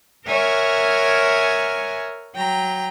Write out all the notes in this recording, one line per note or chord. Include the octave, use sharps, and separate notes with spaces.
A#4 C#5 E5 F#5 G#5 F6
F#3 G5 A#5